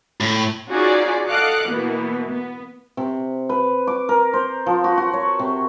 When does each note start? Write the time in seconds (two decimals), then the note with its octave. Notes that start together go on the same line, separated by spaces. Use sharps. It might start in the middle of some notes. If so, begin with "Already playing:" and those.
0.20 A2
0.69 C#4 D#4 F4 F#4 G#4 D5
1.29 A4 D#5 F5 F#5 D6 F#6
1.67 B2 E3 A#3 B3
2.29 B3
2.97 C3
3.49 B4
3.87 D6
4.09 A#4
4.34 C5
4.66 F3
4.84 F#4
4.98 F#4
5.13 C#5
5.39 C3